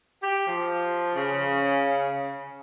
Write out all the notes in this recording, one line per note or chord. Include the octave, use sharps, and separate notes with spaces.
G4
F3
C#3